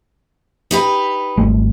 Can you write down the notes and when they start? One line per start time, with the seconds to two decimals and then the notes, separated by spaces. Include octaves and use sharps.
0.71 D#4 G4 B4
1.37 G#1 G3 A3